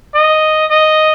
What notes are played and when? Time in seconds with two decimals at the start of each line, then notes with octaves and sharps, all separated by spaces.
0.15 D#5
0.71 D#5